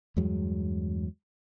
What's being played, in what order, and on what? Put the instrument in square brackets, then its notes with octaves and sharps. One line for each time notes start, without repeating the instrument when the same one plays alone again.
[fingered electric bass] E2 G2 F#3 G#3